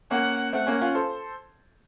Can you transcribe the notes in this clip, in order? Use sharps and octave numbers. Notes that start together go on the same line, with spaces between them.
A#3 C#4 F#5
A3 C4 F#5
A#3 C#4
C#4 F4
A4 C5